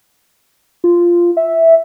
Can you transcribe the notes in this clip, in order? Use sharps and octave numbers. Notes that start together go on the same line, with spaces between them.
F4
E5